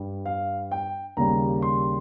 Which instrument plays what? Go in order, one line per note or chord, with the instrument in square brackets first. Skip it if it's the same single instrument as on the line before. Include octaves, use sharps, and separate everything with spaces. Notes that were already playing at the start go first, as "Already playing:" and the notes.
Already playing: [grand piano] G2 G3
F5
G5
D#2 C#3 G3 A#5
C6